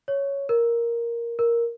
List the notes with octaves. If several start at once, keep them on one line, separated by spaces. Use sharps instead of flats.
C#5
A#4
A#4